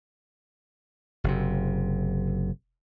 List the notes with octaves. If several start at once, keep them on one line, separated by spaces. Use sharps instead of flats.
F#1 C3